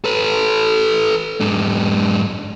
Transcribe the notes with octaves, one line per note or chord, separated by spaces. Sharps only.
A4 B4
G#2 D4